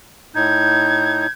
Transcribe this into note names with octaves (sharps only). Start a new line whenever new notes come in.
A2 D#4 G6 G#6